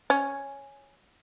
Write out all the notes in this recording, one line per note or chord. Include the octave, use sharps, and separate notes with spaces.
C#4